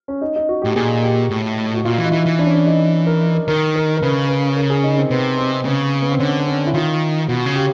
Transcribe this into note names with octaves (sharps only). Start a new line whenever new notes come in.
C#4
D#4
D#4
F#4
A2 G4
A#2 G#4
G4
A2
F#4
A#2 F4
E3
D#4
E3 E4
E3
D4
C#4
D4
D#4
A#4
A#4
D#3 A#4
A#4
A#4
C#3 B4
B4
A#4
G#4
D#4
C4
C3 B3
C4
C#3 B3
B3
C4
D3 C#4
C#4
E4
D#3 F4
B2 F#4
C#3
G4